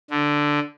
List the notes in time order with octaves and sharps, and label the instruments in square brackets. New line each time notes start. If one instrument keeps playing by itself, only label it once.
[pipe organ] D3